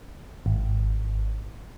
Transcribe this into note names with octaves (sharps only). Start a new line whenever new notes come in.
G#1